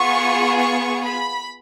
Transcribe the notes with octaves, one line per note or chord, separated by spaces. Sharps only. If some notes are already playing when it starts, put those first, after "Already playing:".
Already playing: B3 F4 G#4 C#6
C#6
B5